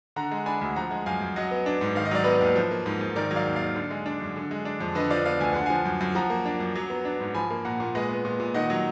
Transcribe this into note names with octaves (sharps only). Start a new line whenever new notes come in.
D3 F#5 A#5
G#3
D4 G#5 B5
D2
F3 F#5 A#5
G#3
F#2 F5 G#5
F#2
F#3 D#5 F#5
B3
D4
G#2
D#3 F5
D#5
F#3 D5
B3 B4 D#5
D#2
F3
A#3
G#2
G#2
D#3 A#4 D5
F#3
D5 F5
D#2
D#2 D5 F5
D3
G#3
D4
F#2
D3
G#3
D4
F2
D3 B4 D#5
F3 D5 F5
B3 D5 F5
D2 G#5
D3 F#5
F3 F5 G#5
F#2
F#2
F3 F#5 A#5
A#3
D4
F#2
F#3
B3
D4
G#2
F3 G#5 B5
A#3
A#2 F#5 A#5
A#2
G#3 B4 D#5
B3
A#2
A#2
D#3 D#5 F#5
F#3